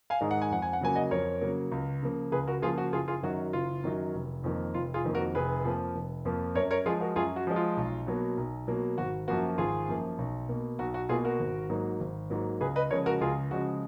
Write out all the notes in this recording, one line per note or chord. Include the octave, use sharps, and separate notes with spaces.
F5 G#5
G#2 D#3 G#3
F#5
G#5
F2 F#5
G#5
F#5
C#3 F#3 A#3 G#5
D#5 F#5
F2 A#4 C#5
C#3 F#3 A#3
C#2
C#3 F3 A#3
C#2 G#4 B4
F#4 A#4
C#3 F3 A#3 F4 G#4
F#4
F#1 F4 G#4
F4 G#4
F#2 D#3 F#3 F#4
F#1 F4
F#2 D#3 F#3
F1
F2 D#3 A#3
F1 F4
F4 G#4
F2 D#3 A#3
F#4 A#4
F1 G#4 B4
F2 F3 A#3
F1
F2 F3 A#3
F#2 A#4 C#5
A#4 C#5
F3 G#3 F4 G#4
F#4 A#4
F#2 F4 G#4
F#4
F3 G#3
F4
B1
B2 F#3 A#3
B1
B2 F#3 A#3
G#1 F#4
F#2 F3 A#3 F#4
G#1 F4 G#4
F#2 F3 A#3
B1
B2 A#3
B1 F#4
F#4
B2 A#3 F4 G#4
F#4 A#4
G#1
G#2 F#3 A#3
G#1
G#2 F#3 A#3
C#2 G#4 B4
B4 D#5
C#3 F3 G#3 A#4 C#5
F#4 A#4
C#2 F4 G#4
C#3 F3 G#3 F#4